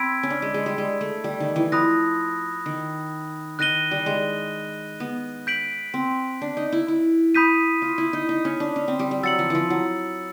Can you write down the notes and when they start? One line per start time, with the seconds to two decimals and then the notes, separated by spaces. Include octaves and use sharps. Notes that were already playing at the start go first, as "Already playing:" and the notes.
Already playing: C4 B5 E6 G#6 B6 D7
0.23 C#4
0.30 D4
0.42 G#3
0.54 G#3
0.66 G3
0.78 G#3
1.01 A3
1.24 G3
1.40 D#3
1.56 E3
1.72 F3 B5 D#6 F#6 A#6
2.66 D#3
3.59 D#3 F#6 A#6 D#7 G7
3.91 G3
4.06 G#3
5.00 B3
5.47 G6 B6 D7 F#7
5.94 C4
6.42 D4
6.57 D#4
6.72 E4
6.88 E4
7.35 B5 D#6 G6 B6 D#7
7.82 F4
7.98 E4
8.13 D#4
8.29 D#4
8.45 C#4
8.60 D4
8.76 C#4
8.88 C4
8.99 G3
9.11 G3
9.23 F#3 E6 A6 C#7 F#7
9.39 F3
9.50 E3 F3
9.70 F#3